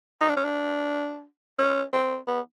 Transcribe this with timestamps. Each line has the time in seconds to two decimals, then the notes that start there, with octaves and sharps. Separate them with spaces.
0.21 D#4
0.28 D4
0.36 C#4
0.44 D4
1.58 C#4
1.93 C4
2.27 B3